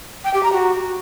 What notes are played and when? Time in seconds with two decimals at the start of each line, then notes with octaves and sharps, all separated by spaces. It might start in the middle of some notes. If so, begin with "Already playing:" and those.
0.24 G5
0.33 G4
0.43 A#5
0.52 F#4